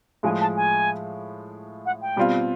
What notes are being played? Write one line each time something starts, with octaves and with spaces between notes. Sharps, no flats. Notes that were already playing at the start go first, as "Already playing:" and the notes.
A2 F3 G#3 G#5
A5
G#5
F#5
G5
B2 G3 C4 F4